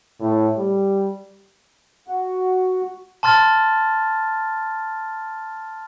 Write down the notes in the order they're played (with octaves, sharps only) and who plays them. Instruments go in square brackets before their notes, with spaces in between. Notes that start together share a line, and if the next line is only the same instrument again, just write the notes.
[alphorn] A2
G3
[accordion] F#4
[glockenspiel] A5 C6 F6 A6